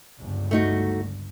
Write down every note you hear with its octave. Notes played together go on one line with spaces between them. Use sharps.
G1 C#2 G2
A3 D#4 F#4